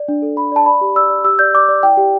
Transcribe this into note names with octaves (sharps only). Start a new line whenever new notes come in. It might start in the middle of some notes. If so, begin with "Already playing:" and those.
Already playing: D5
D4
A4
A4 B5
D5 A5
D5 B5
G4
D5 E6
D5
G4 E6
D5 G6
D5 D6
D5
E4 G5
G4